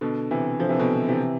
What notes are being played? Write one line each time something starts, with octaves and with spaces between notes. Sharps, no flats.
B2 D3
C3 E3
D3 F3
C3 E3
B2 D3
C3 E3